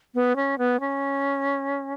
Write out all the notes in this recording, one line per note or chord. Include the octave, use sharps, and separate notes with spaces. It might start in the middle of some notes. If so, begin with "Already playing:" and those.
B3
C#4
B3
C#4